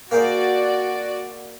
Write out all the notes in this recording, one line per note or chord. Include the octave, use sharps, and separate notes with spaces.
A#3 F#4 G#4 C5 D5